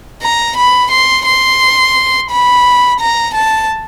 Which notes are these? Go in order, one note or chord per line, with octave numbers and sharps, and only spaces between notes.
A#5
B5
C6
C6
B5
A#5
A5